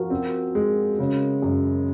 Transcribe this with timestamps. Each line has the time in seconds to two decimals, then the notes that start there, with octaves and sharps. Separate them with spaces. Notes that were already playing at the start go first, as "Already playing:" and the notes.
Already playing: F3 F#4 A#4
0.10 C4
0.55 G#3
0.99 C#3
1.42 F#2